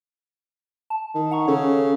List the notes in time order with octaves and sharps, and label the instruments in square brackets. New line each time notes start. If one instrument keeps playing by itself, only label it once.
[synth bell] A5
[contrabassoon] D#3
[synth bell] F#5 A#5 C#6
[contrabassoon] C#3 [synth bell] A4 C#5